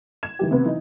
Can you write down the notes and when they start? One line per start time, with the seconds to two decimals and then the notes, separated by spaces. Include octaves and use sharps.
0.23 G#6 E7
0.39 D#3 E3 G4
0.51 C3 B3 C4
0.65 E3 D#4